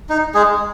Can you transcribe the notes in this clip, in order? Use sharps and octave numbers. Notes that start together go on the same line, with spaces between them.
D#4
G#3 G#4